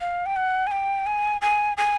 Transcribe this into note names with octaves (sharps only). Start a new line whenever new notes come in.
F5
G5
F#5
G#5
G5
G#5
G#5
G#5